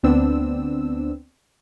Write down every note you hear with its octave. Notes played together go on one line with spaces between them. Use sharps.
D2 B3 C4 D4 E6